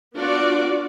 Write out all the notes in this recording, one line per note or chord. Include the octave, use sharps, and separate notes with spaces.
B3 D4 F4 F#4 D5